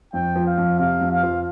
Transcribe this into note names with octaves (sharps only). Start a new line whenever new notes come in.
F2 G5
F3
F5
F2
C3 F5
F2
F5
F3